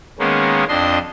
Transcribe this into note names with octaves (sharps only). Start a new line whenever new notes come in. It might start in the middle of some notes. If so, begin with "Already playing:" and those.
D#3 G#3 A#3 B3 C#4
F2 D4 D#5 C6